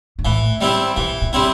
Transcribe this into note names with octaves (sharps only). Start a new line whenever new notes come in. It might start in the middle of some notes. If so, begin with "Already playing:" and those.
G2
A2 E3
G3 C4 E4
B2 E3
B2
G3 C4 E4